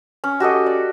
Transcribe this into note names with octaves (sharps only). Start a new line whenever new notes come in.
C#4
F#4 G4 A4 D#5
D5